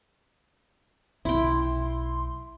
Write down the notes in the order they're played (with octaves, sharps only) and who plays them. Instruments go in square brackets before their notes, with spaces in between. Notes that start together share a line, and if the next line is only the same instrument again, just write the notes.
[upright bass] B1 [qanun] E4 G5 [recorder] C6